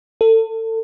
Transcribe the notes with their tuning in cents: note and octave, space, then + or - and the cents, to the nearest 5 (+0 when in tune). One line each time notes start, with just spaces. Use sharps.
A4 +30